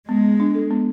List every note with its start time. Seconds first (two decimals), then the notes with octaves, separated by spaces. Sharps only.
0.09 G#3 B3
0.24 B3
0.40 D4
0.55 A4
0.71 B3